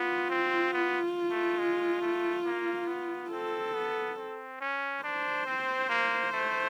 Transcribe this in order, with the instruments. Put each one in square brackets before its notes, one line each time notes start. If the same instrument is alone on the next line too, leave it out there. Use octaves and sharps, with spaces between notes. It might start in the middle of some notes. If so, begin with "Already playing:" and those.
Already playing: [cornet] B3 [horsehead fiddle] F4
[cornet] C4
B3
A3
G#3
A3
A#3
B3
[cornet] C4 [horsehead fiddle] A4
[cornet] B3
C4
C#4
[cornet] D4 [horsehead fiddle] C5
[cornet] C4
A#3
A3